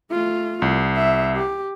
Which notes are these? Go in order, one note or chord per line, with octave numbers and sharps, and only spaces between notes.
A3 F4
C2
E5
G4